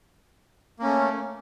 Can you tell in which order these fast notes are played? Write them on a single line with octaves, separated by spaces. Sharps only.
A#3 C#4 A3